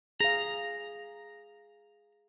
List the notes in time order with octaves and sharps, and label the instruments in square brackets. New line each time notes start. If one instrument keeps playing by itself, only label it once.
[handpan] G#4 F5 [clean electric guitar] A#5